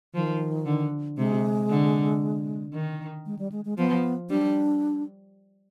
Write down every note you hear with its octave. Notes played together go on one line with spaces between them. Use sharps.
D#3 F3
D3
C3 G#3
D3
D#3
G#3
G3
G#3
G#3
F3 B3
G3 D4